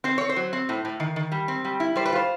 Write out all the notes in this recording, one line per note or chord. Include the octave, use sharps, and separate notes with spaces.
C4 C5
C4 C#5
C5
F#3
C4
A2
A2
D#3
D#3
G3
C4
G3
E4
G3 C5
B4
F4 C5